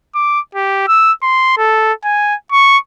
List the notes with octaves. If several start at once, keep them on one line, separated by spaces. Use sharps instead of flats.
D6
G4
E6
C6
A4
G#5
C#6